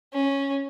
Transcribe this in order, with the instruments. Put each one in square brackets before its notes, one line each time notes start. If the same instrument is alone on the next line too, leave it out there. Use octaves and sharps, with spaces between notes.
[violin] C#4